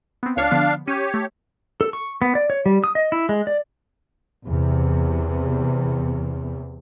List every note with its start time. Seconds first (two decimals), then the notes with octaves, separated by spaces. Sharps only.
0.23 B3 C4
0.37 C#2 D4 C#5 F5
0.51 D3 F3 B3
0.88 C#4 G4 C#5 D#7
1.14 A3
1.81 A4
1.93 C#6
2.22 B3
2.35 D5
2.50 C#5
2.66 G3
2.84 D#6
2.95 D#5
3.12 E4
3.29 G#3
3.47 D5
4.46 E2 C3